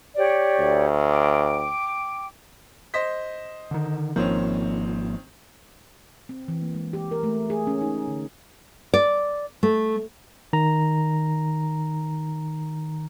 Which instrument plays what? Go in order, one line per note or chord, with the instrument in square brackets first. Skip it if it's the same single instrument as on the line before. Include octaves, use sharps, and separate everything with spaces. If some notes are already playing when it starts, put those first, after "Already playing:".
[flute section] G4 C#5 D5
[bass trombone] D2
[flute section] G5 D6
[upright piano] C5 D#5 B6
[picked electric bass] D3 D#3
[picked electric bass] G#1 F3 A#3 [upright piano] D#3 C4 C#4
[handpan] C4
E3
A#3
G#3
G4
A#4
A3
G#4
C#4
D#4
D3
[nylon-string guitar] D5
A3
[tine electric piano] D#3 A#5